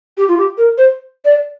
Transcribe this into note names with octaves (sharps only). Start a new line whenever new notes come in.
G4
F4
G4
A#4
C5
D5